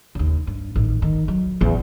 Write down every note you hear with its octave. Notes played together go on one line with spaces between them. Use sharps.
D#2 C#3
G2
A1 D#3
D#3
F#3
A1 E2